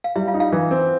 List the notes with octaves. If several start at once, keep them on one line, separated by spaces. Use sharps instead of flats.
F5
G3 E4 E5
F4 F5
D#4
F4 F5
E3
C4